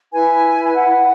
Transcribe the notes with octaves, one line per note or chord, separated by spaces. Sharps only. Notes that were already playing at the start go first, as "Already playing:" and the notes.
E4 B4 G#5
G#5
F#5